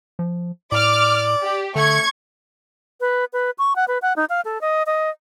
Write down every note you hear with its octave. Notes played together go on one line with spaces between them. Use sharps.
F3
A2 D5 D6 F6
G4
D3 A3 C#6 G#6
B4
B4
C#6
F#5
B4
F#5
D#4
F5
A4
D#5
D#5